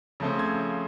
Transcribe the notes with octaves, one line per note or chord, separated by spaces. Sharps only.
C#3 F3 A3 C4
G#6